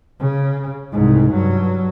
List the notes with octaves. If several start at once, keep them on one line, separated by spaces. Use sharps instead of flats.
C#3
C2 G#2
G2 F#3